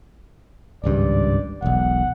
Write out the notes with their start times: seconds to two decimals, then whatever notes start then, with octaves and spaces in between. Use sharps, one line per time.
0.84 G#1 C#2 G2 D5
1.62 E1 B1 F#5